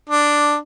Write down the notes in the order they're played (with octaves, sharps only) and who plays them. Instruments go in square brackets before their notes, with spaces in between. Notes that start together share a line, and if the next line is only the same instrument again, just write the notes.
[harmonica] D4